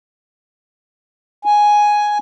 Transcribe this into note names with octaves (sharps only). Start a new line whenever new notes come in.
G#5